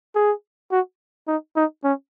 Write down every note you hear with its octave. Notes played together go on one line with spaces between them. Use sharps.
G#4
F#4
D#4
D#4
C#4